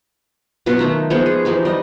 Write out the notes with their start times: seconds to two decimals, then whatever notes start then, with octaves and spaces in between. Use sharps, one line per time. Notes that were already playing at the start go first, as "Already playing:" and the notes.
0.66 B2 F#3 F4 B4
0.79 D#3 A3 D#4
1.10 F3 G#3 B3 C#6
1.26 G#4
1.45 E3 F3 D#4 G4
1.65 G3 D#5